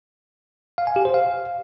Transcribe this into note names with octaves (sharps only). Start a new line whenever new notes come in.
F5
G#5
G4
C5
F5